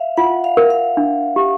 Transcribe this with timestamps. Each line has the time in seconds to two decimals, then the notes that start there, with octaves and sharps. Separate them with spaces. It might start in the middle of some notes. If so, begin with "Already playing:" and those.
Already playing: E5 F5
0.17 F4 F#5
0.44 F5
0.57 A#4
0.70 F5
0.97 D4
1.36 G4